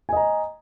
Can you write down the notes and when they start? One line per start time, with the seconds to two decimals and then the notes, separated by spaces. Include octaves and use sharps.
0.09 G#5
0.13 D#5
0.17 A#5